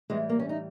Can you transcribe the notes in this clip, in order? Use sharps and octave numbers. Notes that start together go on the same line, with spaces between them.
A2 E3 G3 G#3
A#3
C#4
D#4